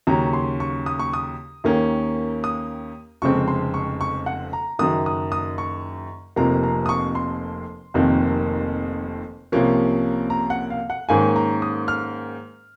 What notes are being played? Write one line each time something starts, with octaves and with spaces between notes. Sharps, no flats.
D#2 C#3 F#3 C#4 A#5
C6
C#6
D#6
C#6
D#6
D#2 D#3 A#3 C#4
D#6
F1 F2 C#3 G#3 C4 C#6
C6
C#6
C#6
F#5
A#5
F#1 F#2 D#3 D#6
D#6
D#6
C#6
F1 F2 C3 F3 A#3 A#5
A#5
D#6
C#6
C6
F1 F2 C3 D#3 A#3
C2 C3 F3 A#3 C#4
A#5
F#5
F5
F#5
G#2 D#3 A#3 C#4 G#5
A#5
D#6
F6